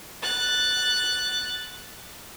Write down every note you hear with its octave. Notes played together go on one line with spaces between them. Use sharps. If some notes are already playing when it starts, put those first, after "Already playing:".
F#6 A6